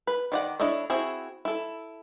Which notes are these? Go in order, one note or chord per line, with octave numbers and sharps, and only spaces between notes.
B4
D#3 D5 F#5
D4 E4 A4 C#5 D#5
C4 E4 F#4 G#4
E4 A4